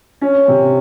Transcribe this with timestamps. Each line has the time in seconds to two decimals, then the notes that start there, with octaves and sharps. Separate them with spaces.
0.22 C#4
0.48 C3